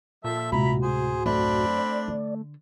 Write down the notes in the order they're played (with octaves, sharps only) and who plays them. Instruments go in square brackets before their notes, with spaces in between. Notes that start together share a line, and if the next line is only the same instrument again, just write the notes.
[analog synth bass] A#2 [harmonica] F3 A4 E5
[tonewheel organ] D2 A2 F#4 [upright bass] C3 G#3 [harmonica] E4 A#5 B5
[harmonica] G#4 C5
[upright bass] F#2 [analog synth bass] A3 [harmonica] C4 D4 B5
[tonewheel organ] D5
[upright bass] D3